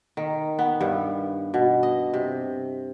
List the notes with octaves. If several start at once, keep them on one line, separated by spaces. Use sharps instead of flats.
D#3
B3
G2
B2
D#5
C3